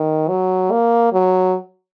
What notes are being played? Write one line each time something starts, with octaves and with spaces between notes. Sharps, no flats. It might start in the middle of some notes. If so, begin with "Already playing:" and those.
Already playing: D#3
F#3
A#3
F#3